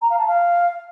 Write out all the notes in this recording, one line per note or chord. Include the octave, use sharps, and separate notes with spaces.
A#5
F5
A5
F5